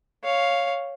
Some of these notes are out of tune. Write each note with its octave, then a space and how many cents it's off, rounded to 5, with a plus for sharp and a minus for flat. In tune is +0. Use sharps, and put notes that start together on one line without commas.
C#5 +0 F5 +0